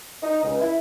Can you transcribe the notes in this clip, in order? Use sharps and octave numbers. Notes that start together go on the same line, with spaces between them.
D#4
C#2
E4